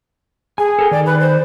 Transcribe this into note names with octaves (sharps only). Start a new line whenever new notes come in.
G#4 G#5
A4 A#4 G5
D#3 D5
B4
C5